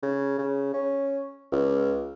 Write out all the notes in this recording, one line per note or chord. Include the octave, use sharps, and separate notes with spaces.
C#3
C#3
C#4
C#2